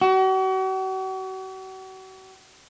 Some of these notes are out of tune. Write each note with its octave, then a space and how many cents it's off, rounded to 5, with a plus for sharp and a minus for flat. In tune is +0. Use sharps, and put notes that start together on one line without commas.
F#4 +40